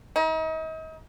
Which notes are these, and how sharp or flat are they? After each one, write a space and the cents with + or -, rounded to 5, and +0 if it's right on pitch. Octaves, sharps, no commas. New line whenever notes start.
D#4 +40